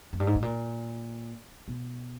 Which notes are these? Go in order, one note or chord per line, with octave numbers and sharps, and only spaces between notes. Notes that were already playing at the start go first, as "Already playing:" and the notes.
F#2
G2
G#2
A2
A#2
B2